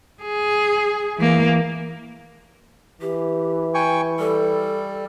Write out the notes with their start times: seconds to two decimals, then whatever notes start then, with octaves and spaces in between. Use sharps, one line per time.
0.23 G#4
1.17 E3 A#3
3.01 E3 G4
3.74 G5 G#5 C#6
4.19 G3 A4